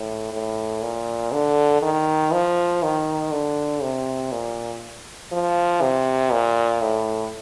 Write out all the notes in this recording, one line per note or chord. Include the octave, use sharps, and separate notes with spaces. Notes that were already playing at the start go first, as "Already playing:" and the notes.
Already playing: A2
A2
A#2
D3
D#3
F3
D#3
D3
C3
A#2
F3
C3
A#2
A2